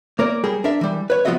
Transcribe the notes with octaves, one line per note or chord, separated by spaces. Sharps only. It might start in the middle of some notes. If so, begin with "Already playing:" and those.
A#3 A#4 C#5 D5
G3 G#4 A#4
D4 A#4 E5
E3 G3
B4 C#5
F3 B3 F4 F#4 D#5 E5